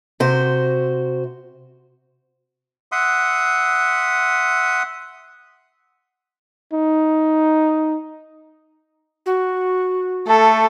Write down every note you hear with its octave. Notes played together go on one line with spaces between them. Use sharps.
C3 F#4 C5
E5 F#5 C6 D#6
D#4
F#4
A3 A4